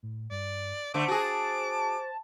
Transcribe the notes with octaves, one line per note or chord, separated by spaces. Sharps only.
A2
G2 D5
D3 A3 C5 D6
F#4 G#4 A5